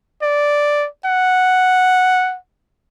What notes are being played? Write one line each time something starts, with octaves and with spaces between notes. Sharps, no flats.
D5
F#5